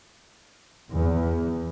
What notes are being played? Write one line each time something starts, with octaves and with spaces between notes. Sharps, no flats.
E2